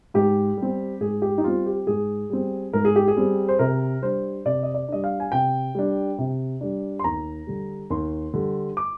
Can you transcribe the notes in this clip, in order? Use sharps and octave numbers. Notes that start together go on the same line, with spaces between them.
G#2 G4
G3 C4
G#2 G#4
G4
D#4
G3 C4 F4
G4
G#2 G#4
G3 C4
G#2 A#4
G#4
G4
G#4
G3 C4
C5
C3 A#4
G3 D4 C5
C3 D5
D#5
D5
G3 D4 D#5
F5
G#5
C3 G5
G3 D4
C3
G3 D4
C6
D#2 A#5
D3 G3
D#2 C6
D3 G3
D6